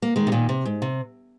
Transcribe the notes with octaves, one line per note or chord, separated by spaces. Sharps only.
A#3
D#3 G#3
C3
A#2 D#3
C3
G#2
C3